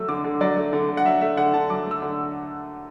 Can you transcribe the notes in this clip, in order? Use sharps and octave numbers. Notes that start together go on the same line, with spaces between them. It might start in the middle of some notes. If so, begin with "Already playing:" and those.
Already playing: F#3 A3 E6
D3 D6
D3
F#3 D5
A3
D3
D3
F#5
F#3 E5
A3 E5
D3 F#5
D3 A5
F#3 D6
A3 E6
D3